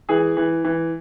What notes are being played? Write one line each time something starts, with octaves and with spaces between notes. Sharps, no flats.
E3 G#4
E3
E3